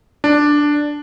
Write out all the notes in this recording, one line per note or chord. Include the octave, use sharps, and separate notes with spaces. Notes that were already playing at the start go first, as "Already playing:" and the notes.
D4